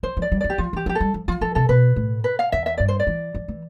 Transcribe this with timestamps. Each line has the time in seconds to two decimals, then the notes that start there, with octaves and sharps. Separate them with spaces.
0.03 F3 C5
0.17 F3
0.22 D5
0.32 G3
0.41 F3 D5
0.50 G4
0.58 F3 F4
0.73 E3 G4
0.86 F3 G4
0.95 A4
1.01 G3
1.14 F3
1.28 F3 F4
1.41 F3 A4
1.55 C3 A4
1.69 B2 B4
1.96 A2
2.24 B4
2.39 F5
2.52 E2 E5
2.66 E5
2.77 G2 D5
2.88 C5
3.00 D5
3.07 E3
3.35 F3
3.48 E3